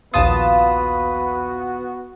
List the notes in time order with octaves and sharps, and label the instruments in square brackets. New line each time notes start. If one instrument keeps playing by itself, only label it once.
[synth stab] A#1 D#2 D#6 [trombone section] B3 F#4 [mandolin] F4 A5 [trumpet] B4